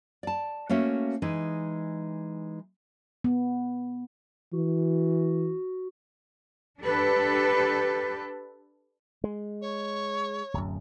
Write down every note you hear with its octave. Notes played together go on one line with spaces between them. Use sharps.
D5 A5
A3 A#3 C#4 F#4 E5
E3 G#3 D#4
B3
E3 F#4
D4 G4 A4 B4
G#3
C#5
D1 F#2